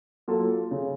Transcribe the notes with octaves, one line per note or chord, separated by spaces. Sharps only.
F#3 A#3 F4 A4
C#3